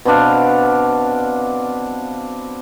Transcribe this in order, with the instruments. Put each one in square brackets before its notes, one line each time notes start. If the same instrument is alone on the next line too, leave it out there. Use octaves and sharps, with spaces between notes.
[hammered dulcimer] B2 C4 D4 F5